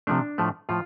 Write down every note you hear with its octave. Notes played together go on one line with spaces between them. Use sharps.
C3 F3 A3 D4
A2 F3 A3
A2 F3 F4